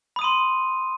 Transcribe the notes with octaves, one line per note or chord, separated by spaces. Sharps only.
B5 C6 D#6 D#7